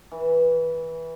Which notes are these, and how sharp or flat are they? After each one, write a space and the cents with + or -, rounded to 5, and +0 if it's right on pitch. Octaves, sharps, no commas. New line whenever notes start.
E3 -15